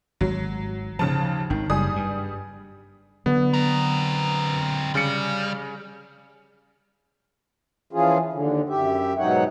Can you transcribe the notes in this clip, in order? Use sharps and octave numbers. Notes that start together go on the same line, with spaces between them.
G#1 F#3
D#2 C#3 F3 A5
G#1 D#3
F#1 G3 G#4 D#6
G2
D3 F#3 B3
C4 A#4
C#3 G3 C#7
E3 F3 C#4 F4 G#4
D#2 D3
F#2 G4 E5
G#2 B2 F#3 D#4 C#5 F#5